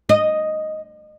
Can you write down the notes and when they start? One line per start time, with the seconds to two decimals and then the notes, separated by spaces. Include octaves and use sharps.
0.09 D#5